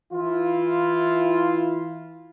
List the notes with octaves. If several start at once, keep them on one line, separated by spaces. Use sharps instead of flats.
E3 E4 F4